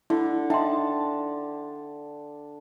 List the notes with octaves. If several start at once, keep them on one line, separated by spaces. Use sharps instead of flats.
D3 E4
D#4 E5 G5 A5 C6